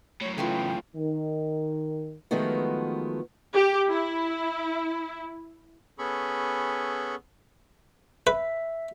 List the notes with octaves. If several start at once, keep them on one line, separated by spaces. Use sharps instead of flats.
F#2 A2 C#5
C#3 E3 A3 B3 F4 G5
D#3
D#3 F3 F#3 G#3 A3 B3
G4
E4
B3 C#4 G#4 A4 B5 C#6
B4 E5